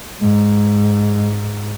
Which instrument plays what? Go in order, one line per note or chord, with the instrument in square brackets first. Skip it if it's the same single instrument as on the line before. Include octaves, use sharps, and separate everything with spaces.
[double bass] G#2 [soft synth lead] G#3